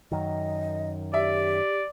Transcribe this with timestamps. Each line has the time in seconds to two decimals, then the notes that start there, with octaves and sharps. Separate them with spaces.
0.11 F#2 D#3 D#5
1.14 G4 D5 E5